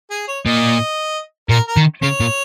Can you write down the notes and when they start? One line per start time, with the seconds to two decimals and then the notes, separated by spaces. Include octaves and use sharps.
0.11 G#4
0.28 C#5
0.46 A#2 D#5
1.49 A#2 A#4
1.68 A#4
1.77 D#3
2.02 C#3 C#5
2.20 A#2